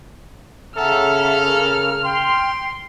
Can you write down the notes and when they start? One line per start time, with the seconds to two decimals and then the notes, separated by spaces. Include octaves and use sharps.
0.76 C#3 C#4 A4 E5 F#5 A#5 F6
1.45 A#4
2.03 G5 C6